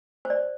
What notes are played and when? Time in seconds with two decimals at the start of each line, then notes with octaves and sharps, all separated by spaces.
0.25 C5
0.30 D5